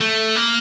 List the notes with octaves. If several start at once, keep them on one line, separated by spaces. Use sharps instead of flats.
A3
A#3